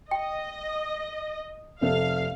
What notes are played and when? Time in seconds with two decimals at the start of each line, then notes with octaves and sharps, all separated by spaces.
0.11 D#5 G5
1.81 F1 C3 A4 F5